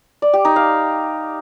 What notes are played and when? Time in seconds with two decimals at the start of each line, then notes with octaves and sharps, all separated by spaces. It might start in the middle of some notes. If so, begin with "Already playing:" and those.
0.22 D5
0.33 G4
0.45 D#4
0.56 F5